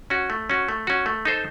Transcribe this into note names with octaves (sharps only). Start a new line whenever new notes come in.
C#4 F#4
A3
C#4 F#4
A3
C#4 F#4
A3
D#4 A4 C5